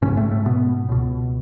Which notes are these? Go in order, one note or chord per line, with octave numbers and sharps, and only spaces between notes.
A1 G#2 C#3 C#4
A2 A3
A2 A3
B2 B3
C#2 B2